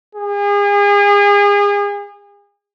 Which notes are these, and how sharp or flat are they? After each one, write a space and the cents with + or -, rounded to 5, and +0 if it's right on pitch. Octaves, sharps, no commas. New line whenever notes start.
G#4 -35